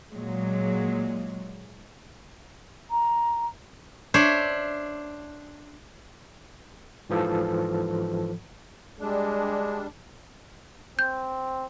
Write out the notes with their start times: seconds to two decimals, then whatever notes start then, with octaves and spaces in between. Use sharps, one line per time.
0.14 A#2 F#3 G#3
2.91 A#5
4.14 D4 C5 C#5 E5
7.10 G#2 E3 F3 A4
9.00 G3 G#3 D4
10.99 C4 G6